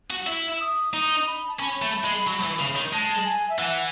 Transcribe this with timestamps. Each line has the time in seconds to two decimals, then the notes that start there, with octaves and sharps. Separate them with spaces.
0.10 F#4
0.26 E4 E6
0.60 D#6
0.93 D#4 D#6
1.26 B5
1.48 A5
1.60 C#4 B5
1.82 A3
2.04 G#3
2.27 F#3
2.43 E3
2.59 C#3
2.76 D#3
2.93 G#3 A5
3.25 G#5
3.49 E5
3.58 E3 F#5